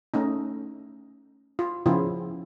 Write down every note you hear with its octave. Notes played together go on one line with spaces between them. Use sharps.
A3 C#4 D#4
F4
C#3 F3 B3 E4 F4